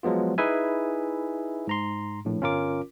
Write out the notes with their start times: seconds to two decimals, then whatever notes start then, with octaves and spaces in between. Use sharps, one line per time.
0.03 F3 F#3 G#3 B3 F4
0.38 D#4 E4 G#4 B4 E5 G#5
1.67 G#2 A#5 C6
2.25 A#1 A2
2.41 G1 C#4 F4 A#4 D6